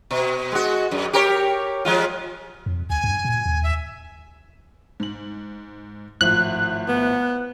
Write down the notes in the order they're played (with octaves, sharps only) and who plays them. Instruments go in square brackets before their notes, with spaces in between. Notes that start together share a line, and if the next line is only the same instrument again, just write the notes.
[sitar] B2
G#3 F#4
F#2
G4 A#4 C#5
F3 G#3 F4
[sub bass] F2
[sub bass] D2 [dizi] G#5
[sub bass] G2
A#2
D#2
[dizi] E5
[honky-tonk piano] G#2 F#7
[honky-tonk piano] G#1 A2 F3 [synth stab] F#6
[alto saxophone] B3